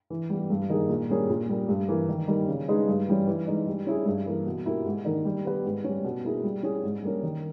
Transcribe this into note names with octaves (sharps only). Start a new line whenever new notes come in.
E3
G3 B3 G4
G2
D#3 A#3 D#4 G#4
A#2
G3 A#3 C#4 G#4
A#2
G3 A#3
G2
E3 A#3
D#3
G3 A#3 D#4
C#3
G#3 D#4 G#4 B4
G2
E3 G3 C#4
E3
G#3 D#4
G3
C#4 E4 G#4
G2
E3 A#3
B2
A#3 E4 G4
G#2
D#3 A#3 D#4
G3
B3 G4 B4
G#2
G3 C#4
B2
A#3 E4 G#4
G3
C#4 E4 G#4
G#2
G3 A#3 C#4
D#3